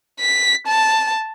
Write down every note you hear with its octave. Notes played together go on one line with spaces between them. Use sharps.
B6
A5